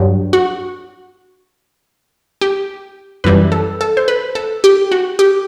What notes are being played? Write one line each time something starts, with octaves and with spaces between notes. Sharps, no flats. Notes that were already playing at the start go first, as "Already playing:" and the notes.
Already playing: G2 F#3 G4
F#4
G4
F#2 E3 G3 B4
A4
A4
C5
B4
A4
G4
F#4
G4